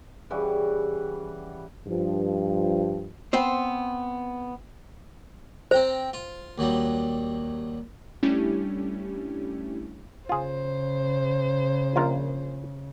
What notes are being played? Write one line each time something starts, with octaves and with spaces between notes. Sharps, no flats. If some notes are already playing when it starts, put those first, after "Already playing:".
C#3 E3 G3 F#4
G2 F3
B3 C4 C5
C4 C5 G5 A#5
F4
D#2 F#3 G3
G3 A3 C#4 D4 E4 G4
C#3 F4 G#4 C5
A#1 F4 A#4